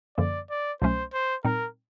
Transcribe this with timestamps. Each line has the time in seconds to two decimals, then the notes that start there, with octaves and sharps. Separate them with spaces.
0.18 F#2 D3 F3 A#3 D5
0.50 D5
0.82 C2 B2 F#3 A3 C#4 C5
1.13 C5
1.45 A#2 G3 C4 D#4 A#4